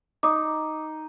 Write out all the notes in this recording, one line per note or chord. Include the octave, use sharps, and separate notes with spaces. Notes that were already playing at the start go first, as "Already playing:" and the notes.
D#4 D6 D#6